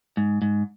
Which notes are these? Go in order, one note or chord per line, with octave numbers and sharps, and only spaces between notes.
G#2
G#2